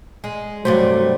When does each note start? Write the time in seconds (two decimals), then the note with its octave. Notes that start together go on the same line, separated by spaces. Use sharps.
0.24 G#3
0.65 G2 C3 F#3 A3 C5